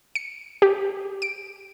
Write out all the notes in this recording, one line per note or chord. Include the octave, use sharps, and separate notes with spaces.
C#7
G4
D7